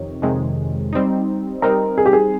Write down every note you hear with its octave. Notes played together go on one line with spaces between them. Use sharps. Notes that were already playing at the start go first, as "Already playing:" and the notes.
Already playing: F2 C3 D#3 C#5
F2 C3 D#3 G#3
G3 C4 D#4
G3 C4 D#4 A#4
G#4
G4
G#4